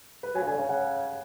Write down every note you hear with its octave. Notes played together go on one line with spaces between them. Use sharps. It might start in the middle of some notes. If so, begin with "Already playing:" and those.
B4
F#3 G#5
C#3
D3 G#5
C#3 G#5
C#3 F#5